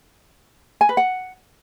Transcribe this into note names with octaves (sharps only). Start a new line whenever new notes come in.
G#5
B4
F#5